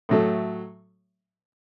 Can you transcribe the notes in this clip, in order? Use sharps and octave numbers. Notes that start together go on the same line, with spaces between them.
A2 F#3 A3